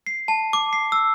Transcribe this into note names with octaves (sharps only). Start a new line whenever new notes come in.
C7
A5
D6
C7
E6